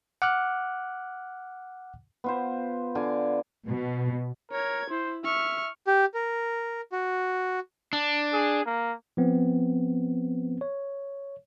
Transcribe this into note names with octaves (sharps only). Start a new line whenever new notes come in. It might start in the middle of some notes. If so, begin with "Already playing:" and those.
F#5 D6 F6 F#6
B3 F4 C5
D3 F4 G#5 D6
B2
A#4 C#5 G#6
E4 C5
E5 C#6 F6
G4
A#4
F#4
D4
G#4
A#3
F3 B3 C4
C#5